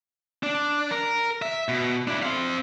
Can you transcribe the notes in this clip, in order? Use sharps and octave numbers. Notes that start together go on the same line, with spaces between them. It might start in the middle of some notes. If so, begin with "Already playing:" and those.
D4
A#4
E5
B2
D4 E4
C4 F5